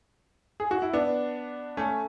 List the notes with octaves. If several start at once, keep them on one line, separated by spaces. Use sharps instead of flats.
G#4
F#4
E4
B3 D4
A3 C#4